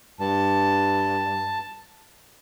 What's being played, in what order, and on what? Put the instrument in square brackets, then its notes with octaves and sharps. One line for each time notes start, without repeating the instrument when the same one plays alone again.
[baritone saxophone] G2 [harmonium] A5